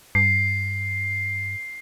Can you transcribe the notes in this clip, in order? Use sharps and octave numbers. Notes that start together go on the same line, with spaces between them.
G2 C7